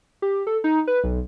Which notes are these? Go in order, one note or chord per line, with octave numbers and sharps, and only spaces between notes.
G4
A4
D#4
B4
B1